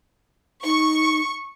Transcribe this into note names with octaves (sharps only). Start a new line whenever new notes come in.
D#4 C#6